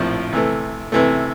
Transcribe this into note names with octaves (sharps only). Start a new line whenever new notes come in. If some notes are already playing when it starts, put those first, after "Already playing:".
Already playing: A#1 A2 F3 C4 F4
C3 E3 A3
C3 E3 A3